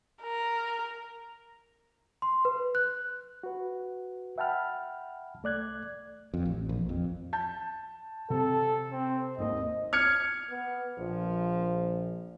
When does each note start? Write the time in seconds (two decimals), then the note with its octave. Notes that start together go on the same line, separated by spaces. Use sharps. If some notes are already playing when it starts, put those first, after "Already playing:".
0.23 A#4
2.22 C6
2.45 B4
2.75 F#6
3.43 F#4 B4
4.38 E5 F#5 G5 A5 B5 F6
5.43 C2 A3 D5 F#6 G#6
6.34 F2
6.45 A1
6.69 A#1
6.89 F2
7.33 A5 G6 A6
8.30 C3 A4
8.92 C4
9.38 G#1 D#2 C5 D#5
9.93 F6 G#6 C#7
10.50 B3
10.98 A#1 F3